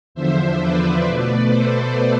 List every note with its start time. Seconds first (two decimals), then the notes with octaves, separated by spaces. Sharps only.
0.15 E2 D3 F3 C5 E5
0.60 B4 D5
1.05 B2 A3
1.49 A4 C5